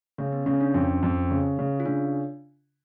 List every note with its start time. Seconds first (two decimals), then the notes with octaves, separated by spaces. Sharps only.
0.18 C#3 C#4
0.33 B3
0.46 C#3 C#4
0.61 D4
0.74 F2 C#4
1.03 F2
1.30 C#3
1.59 C#3
1.80 F4
1.86 C#3 D4